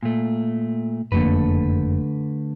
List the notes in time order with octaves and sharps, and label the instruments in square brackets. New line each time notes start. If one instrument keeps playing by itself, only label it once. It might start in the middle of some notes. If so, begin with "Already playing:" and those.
[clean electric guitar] A#2 A3
[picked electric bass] F#1 F2 A#3 [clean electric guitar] D3 A3 B4